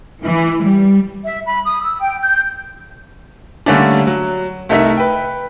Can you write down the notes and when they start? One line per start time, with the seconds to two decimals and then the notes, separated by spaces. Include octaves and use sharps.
0.23 E3
0.63 G3
1.24 E5
1.47 B5
1.65 D#6
1.82 E6
2.01 G5
2.23 G6
3.66 D3 G3 A3 A#3 C#4 D4
4.07 F#3
4.69 C2 A3 D#4 A#4 E5
4.97 B4 G5